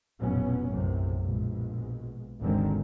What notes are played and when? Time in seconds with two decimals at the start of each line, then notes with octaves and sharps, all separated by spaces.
0.20 F1 A#1 B2 F#3 B3 C#4
0.69 B1 F#2 A2 C3
1.22 A#1 B2 G#3
2.39 G#1 D#2 D3 D#3 G#3 C4